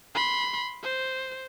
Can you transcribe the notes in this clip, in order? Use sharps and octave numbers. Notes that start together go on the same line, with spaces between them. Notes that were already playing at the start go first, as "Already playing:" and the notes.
B5 C6
C5